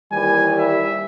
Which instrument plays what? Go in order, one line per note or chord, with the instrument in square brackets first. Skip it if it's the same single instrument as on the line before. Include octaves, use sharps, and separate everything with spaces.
[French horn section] D#2 E3 G3 [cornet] G#5
[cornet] E5